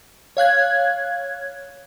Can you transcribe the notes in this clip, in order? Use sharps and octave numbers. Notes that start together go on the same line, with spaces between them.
C#5 F5 F#6 G#6